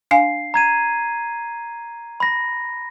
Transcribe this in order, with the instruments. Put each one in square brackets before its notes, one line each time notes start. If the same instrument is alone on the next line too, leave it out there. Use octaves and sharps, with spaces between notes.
[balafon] D4 F5 G#5 [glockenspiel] C7
[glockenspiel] A#5 G#6 D#7
B5 A#6